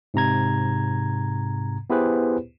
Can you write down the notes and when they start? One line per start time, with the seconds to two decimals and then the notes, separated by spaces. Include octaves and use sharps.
0.14 G#2 C3 A#5 G#6
1.90 B3 E4 G4 G#4 B4 C5